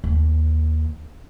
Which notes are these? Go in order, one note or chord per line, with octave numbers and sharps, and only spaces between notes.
D#2